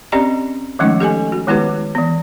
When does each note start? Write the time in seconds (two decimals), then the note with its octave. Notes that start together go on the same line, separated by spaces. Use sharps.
0.12 C4 C#4 G4 D5 D#5 A#5
0.79 D#3 F3 G#3 A3 C#4 D#4
1.00 G4 A4 D#5 G#5
1.32 F#4
1.47 D#3 G#3 B3 E4 G4 B4
1.95 E3 B3